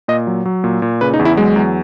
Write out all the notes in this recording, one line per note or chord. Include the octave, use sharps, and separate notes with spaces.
A#2 D#5
F#3
F#3
A#2
A#2
C#3 B4
D#4
E2
E4
F#3 G#3
E2